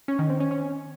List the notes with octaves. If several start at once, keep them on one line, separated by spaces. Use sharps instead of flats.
C#4
D#3
C4
C#4
C#4